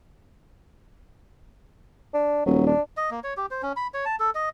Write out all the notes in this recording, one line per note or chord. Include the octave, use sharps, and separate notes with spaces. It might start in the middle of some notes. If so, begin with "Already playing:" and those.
D4
D#1 F#3
D4
D#5
A#3
C#5
G4
C5
C#4
B5
C#5
A5
A4
D#5